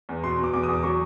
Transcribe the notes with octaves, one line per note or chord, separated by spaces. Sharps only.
E2
B2 C6
B2 D6
E2 D6
D#6
E2
D6
F#3 C#6